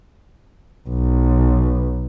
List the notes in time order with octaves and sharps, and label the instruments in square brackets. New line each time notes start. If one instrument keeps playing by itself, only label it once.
[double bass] B1